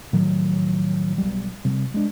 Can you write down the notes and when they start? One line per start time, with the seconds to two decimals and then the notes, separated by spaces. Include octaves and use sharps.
0.13 A2 D#3 F3 F#3
1.18 B1 G3
1.65 C3 G3
1.94 G#3 D4